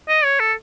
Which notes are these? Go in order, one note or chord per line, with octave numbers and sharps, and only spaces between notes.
D#5
C#5
A4